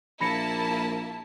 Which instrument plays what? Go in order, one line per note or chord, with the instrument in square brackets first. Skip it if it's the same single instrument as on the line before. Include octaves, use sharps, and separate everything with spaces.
[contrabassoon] A#1 [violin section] A#3 E4 A5 [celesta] B5 A#6 C#7